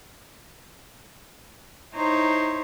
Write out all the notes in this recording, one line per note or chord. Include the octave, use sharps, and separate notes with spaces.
D#4 E4 C5 C#5 A#5 C6